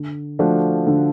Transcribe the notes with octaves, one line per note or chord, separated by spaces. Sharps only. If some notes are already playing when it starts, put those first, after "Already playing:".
Already playing: D3
F3 A3 D4 F#4
D3